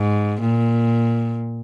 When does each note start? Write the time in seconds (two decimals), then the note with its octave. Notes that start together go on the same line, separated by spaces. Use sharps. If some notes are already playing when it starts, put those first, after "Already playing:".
Already playing: G#2
0.41 A#2